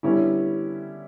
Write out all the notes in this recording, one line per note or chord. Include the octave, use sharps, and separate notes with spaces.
D3 G3 B3 C#4 E4